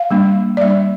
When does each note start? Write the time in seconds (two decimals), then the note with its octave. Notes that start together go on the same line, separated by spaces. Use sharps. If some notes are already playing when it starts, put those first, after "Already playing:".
Already playing: F5
0.11 G3 A#3 D4
0.57 D5
0.61 G3 A#3 D4 E5